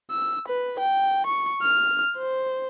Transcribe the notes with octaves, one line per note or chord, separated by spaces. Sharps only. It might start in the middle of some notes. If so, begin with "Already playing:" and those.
E6
B4
G5
C#6
F6
C5